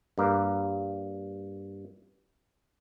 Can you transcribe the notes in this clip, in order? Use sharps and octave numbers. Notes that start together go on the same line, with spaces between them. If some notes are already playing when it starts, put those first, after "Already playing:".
G2 A#3